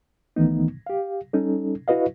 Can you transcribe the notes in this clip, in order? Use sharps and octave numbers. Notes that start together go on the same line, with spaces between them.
C#2 D#3 E3 A3 B3 D#4
G4 F5
G3 C#4 D#4 A4
E4 F#4 B4 D#5 F5